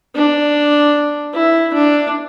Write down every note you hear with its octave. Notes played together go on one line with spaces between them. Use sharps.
D4
E4
D4